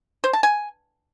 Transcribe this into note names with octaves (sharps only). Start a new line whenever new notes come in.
C5
A5
G#5